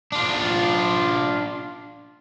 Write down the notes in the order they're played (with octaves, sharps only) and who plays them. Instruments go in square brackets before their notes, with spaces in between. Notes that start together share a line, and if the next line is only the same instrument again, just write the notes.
[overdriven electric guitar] D4 F4